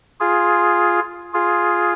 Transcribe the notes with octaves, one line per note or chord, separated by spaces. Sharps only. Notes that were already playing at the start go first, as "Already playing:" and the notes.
F4 G#4
F4 G#4